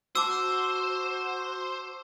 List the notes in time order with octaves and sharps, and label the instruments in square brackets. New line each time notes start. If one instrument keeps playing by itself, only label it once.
[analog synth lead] F#4 [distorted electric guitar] C5 [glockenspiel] A5 D6 E6